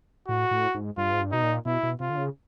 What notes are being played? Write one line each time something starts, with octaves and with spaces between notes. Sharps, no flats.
A2 F#4
A2
G#2
G2 F4
G#2
G2
B2 D#4
A#2
B2 E4
B2
C3 F4
D3
C#3